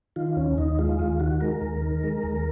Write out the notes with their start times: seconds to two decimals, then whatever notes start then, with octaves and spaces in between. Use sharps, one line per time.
0.16 D#3 F4
0.36 D#2 C#4
0.58 D#2 D#4
0.79 G#3 F4
0.99 D#2 F4
1.20 D#3 F#4
1.41 G#3 A#4
1.62 D#2
1.82 D#3
2.03 G#3
2.24 D#2